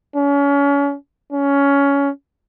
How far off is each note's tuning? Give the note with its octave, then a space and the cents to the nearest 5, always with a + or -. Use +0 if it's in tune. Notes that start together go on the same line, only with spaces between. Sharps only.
C#4 +35
C#4 +15